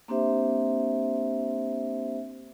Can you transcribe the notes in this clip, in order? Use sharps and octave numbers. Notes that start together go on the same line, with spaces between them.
A#3 C4 D4 G4 C5 E5